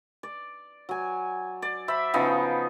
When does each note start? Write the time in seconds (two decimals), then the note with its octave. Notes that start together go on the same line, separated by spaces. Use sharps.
0.23 D5
0.89 F#3 G#5
1.62 D5
1.88 C5 E5 B5
2.14 C#3 F3 B3 D#4